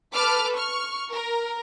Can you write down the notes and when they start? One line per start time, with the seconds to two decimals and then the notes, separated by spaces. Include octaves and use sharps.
0.15 A4 B4 D6 F6
0.56 C#6 F6
1.10 A#4